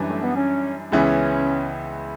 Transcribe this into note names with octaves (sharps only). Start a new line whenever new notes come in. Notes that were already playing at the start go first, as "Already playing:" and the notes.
Already playing: F#2 E3 G3 D4
A3
B3
C#4
C#2 C#3 E3 B3 C#4 E4